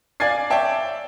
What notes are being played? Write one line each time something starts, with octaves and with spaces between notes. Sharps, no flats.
D5 F5 G#5 G#6 A6 C7
C#5 D5 E5 G5 A5